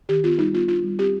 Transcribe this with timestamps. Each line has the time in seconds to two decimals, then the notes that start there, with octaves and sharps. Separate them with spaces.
0.09 D#3 G4
0.24 B3 F4
0.38 G3 D#4
0.53 B3 F4
0.68 D4 F4
0.83 G3
0.99 C4 G4